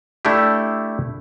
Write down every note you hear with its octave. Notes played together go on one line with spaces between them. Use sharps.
A3 D4 E4 G4